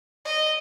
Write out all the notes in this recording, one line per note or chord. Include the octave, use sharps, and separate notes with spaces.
D#5